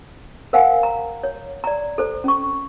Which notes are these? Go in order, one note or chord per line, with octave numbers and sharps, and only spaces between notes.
A#4 C5 F5 F#5 G#5
A#5
C#5
D5 A#5
A4 C5
C#4 C#6